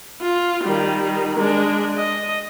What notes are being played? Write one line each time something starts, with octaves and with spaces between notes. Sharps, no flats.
F4
D#3 G3
G#3 D4
D#5